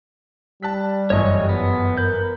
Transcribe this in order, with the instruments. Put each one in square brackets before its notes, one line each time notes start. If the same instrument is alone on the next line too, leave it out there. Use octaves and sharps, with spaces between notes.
[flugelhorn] G3 [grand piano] A5 F#6 B6
[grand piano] G1 F#2 E3 [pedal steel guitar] C#5 D#5 C#6
[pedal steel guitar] B3
[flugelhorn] A#4 [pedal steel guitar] B4 G6